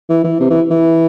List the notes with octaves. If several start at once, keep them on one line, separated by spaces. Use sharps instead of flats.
E3
E3
C3
E3
E3